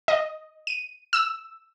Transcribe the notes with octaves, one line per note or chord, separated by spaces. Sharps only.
D#5
D#7
E6